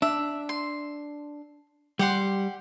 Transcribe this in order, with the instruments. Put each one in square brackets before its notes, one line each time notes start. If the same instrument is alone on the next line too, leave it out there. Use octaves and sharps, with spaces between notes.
[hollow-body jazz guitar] D4 [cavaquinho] E5
[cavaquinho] C6
[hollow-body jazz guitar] G3 [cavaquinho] G4 F#5 C6